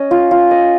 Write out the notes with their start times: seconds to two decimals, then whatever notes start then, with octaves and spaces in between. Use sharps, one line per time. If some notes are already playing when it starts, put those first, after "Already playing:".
Already playing: C#4 D#5
0.11 F4
0.31 F4
0.51 D#5